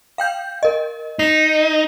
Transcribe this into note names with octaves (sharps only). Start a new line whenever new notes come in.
F5 G5 G6
A#4 D#5
D#4 C7 E7